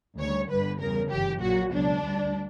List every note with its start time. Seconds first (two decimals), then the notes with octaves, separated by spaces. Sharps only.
0.18 D2 C#3 G3 C#5
0.49 G1 G2 D3 G3 B4
0.80 E2 C#3 G3 A#4
1.10 G1 F#2 E3 G4
1.41 A#1 A#2 F#3 F#4
1.72 C#2 B2 F#3 D4
2.02 D2 D3 G3